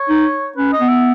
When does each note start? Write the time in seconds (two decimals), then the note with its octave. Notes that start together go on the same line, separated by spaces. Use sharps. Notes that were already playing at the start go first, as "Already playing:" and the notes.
Already playing: C#5
0.09 D#4
0.56 C#4 B4
0.73 D#5
0.80 B3
0.89 E5